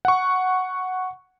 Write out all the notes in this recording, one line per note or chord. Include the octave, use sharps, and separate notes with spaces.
F#5 C#6